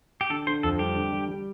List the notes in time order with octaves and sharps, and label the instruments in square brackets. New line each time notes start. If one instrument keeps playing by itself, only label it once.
[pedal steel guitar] G4
[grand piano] D3 [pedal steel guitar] A4
[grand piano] D3 [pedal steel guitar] C5
[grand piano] F2 [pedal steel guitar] A4
[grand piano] G3 [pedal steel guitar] G4
[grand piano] D3
G3
G3